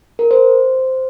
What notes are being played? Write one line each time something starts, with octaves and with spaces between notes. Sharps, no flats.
A#4
C5